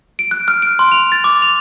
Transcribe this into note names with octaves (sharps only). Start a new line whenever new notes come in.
D7
F#6
F6
D7
C6
F7
A6
D6
F7